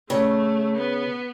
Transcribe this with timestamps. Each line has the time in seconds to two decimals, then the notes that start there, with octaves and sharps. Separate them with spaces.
0.09 C#3 A3
0.77 B3